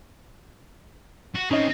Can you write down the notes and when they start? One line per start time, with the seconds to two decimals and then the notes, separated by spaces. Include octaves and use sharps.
1.35 F#4
1.51 C4 C#4 D#4 G#4